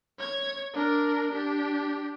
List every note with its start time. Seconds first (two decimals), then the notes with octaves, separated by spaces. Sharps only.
0.19 C#5 G#6
0.74 D4 A#4
1.31 D4 G4